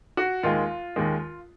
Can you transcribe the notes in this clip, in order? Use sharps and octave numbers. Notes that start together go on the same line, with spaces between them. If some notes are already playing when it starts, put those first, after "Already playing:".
F#4
D#2 D#3 G#3 F4
D#2 D#3 G#3